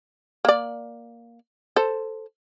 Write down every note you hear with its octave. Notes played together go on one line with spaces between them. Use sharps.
A#3 D5
A4 C5